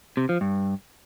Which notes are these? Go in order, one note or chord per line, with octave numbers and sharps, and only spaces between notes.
C3
F3
G2